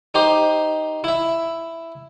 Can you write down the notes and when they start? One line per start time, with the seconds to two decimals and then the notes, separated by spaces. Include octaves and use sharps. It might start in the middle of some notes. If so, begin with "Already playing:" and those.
0.15 D#4 G4 C5
1.04 E4 E5